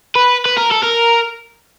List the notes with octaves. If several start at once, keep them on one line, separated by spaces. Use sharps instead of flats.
B4
B4
A#4
A4
A#4